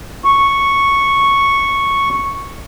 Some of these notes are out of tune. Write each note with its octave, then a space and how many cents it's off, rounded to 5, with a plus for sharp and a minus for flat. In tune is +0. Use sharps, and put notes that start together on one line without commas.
C#6 -5